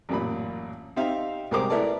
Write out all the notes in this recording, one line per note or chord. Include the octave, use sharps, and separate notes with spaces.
A1 F#2 A#2 B5
C4 D#4 G4 E5 F5
C2 G#3 G4 A#4 C5 D6
A3 E4 A#4 B4 D5 A5